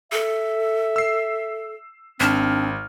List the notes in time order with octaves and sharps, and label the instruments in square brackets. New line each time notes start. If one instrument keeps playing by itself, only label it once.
[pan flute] A4 [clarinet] E5
[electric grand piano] E6 C7
[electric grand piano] G#1 F6 [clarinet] C4 [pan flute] D4